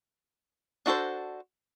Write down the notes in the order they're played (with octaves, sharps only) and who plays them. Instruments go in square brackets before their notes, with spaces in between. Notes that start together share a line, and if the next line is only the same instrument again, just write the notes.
[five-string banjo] D4 F#4 A4 C5